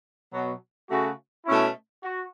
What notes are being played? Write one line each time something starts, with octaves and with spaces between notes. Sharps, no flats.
B2 F#3 B3 F#4
C#3 A3 F#4
B2 A3 C#4 E4
F#4